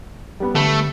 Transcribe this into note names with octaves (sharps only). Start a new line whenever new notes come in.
G3 B3
D3 A3